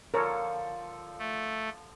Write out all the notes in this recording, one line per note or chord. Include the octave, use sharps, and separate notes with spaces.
D3 F3 A4 A#4 C#5
A3